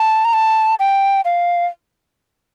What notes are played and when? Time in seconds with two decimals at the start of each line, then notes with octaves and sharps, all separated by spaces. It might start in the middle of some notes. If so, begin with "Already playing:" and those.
Already playing: A5
0.25 A#5
0.33 A5
0.80 G5
1.25 F5